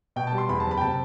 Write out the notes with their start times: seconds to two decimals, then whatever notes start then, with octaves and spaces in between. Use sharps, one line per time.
0.16 B2 G5
0.27 A5
0.32 G3
0.38 C6
0.49 E2 B5
0.60 F#1 A5
0.71 B5
0.77 G5
0.81 C3 A5